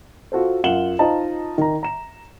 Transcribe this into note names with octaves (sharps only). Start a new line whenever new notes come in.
F4 F#4 A4 C5
F#2 F4 F#5 E7 F#7 G7
D#4 F4 C5 D#5 A5 A#5
D#3 A#5
A#5 E7